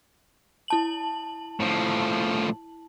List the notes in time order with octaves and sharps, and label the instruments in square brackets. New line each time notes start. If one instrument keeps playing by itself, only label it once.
[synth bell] E4 A5 F#7
[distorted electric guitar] A2 F3